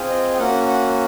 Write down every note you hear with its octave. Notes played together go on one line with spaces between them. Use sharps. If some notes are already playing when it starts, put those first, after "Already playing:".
Already playing: C4 F4 G#4
D#5
G5
A#3 C#4 F#4 F#5
F#5